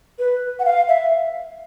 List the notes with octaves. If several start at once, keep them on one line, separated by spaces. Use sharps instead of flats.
B4
F#5
F5
E5